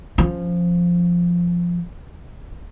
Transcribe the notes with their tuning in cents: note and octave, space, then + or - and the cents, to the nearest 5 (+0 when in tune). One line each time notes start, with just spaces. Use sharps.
F3 +0 C#4 +0